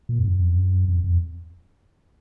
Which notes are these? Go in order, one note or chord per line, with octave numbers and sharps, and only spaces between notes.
A#2
F2
F#2
F2
F#2
F2
F2